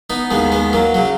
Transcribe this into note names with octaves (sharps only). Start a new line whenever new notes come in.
B3 D#4
D#2 D#3 G#3 B3
G#3 B3
F#3 A#3
C#3 F#3